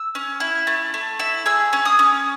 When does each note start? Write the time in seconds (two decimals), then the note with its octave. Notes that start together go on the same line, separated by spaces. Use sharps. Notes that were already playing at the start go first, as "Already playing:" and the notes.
Already playing: E6
0.15 C#4
0.40 E4
0.67 A3
0.94 A3
1.19 E4
1.46 G#4 E6
1.73 C#4
1.85 D#6
1.99 C#4